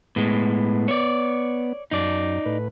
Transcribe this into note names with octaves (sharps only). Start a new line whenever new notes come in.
A2 G#3 B3
C#5 D5
F#2 D#4 D5
A2 B4